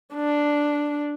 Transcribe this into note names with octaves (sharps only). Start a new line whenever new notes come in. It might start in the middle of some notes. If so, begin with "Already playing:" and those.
D4